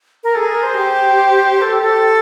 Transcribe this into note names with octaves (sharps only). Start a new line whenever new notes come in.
A#4
G#4 A4
A#4
C5
G4
A4
A4